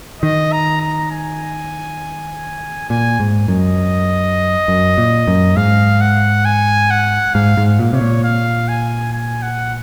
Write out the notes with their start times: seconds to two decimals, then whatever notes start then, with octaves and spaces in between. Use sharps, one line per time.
0.22 D#3 D#5
0.52 A#5
0.82 A#5
1.12 G#5
2.90 A#2 G#5
3.20 G#2
3.48 F#2 D#5
4.68 F#2
4.98 A#2
5.27 F#2
5.57 G#2 F5
6.01 F#5
6.45 G#5
6.90 F#5
7.34 G#2 F5
7.57 G#2
7.79 A#2
7.93 C3 C#5
8.01 A#2
8.24 F5
8.68 G#5
9.13 G#5
9.42 F#5